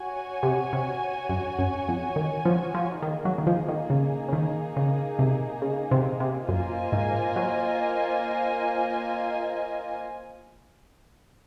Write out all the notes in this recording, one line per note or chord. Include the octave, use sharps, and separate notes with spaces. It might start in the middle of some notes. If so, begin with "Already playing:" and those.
Already playing: F#4 C#5 G#5
C3
C3
F#2
F#2
F2
D#3
F3
F3
D#3 A#3 D#4 G#4
F#3
D#3
F3
D#3
C#3
C#3
D#3
C#3
C3
C#3
C3
C3
F#2 A#3 F4 C5 D#5 G#5
G#2
F#3